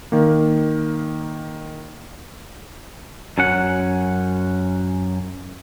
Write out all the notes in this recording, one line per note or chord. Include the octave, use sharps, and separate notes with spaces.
D#3 A#3
F#2 C#4 F#5